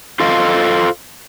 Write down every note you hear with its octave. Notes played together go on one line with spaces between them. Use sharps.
F4 A4 C5 D#5 F5